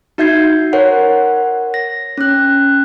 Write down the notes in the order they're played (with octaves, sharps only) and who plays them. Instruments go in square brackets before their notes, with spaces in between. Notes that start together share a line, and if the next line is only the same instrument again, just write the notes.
[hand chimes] D#4 F#4 E5 G6 G#6 C7
A#4 C5 C#5 F#5
A#6
C#4 F#6